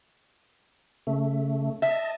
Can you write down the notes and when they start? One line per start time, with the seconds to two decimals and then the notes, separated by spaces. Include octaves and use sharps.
1.07 C#3 A3
1.82 D#5 E5 A5